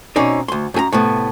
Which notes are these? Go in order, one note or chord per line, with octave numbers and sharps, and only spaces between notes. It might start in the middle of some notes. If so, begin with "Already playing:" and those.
B2 C4 C#4 D#4 D5
D2 C6
F#2 G#4 A#5
A2 C3 B3